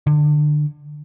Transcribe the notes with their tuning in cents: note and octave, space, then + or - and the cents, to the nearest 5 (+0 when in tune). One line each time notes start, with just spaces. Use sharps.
D3 +25